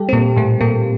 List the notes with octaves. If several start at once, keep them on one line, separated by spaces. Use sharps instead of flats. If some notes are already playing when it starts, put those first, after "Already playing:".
Already playing: G3 G4 A4
C4
A#2 A#3
A2 A3
A#2 A#3